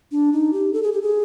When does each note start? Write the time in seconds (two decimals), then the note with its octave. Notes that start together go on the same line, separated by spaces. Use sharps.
0.12 D4
0.33 D#4
0.53 G4
0.73 A4
0.83 G#4
0.93 G4
1.02 G#4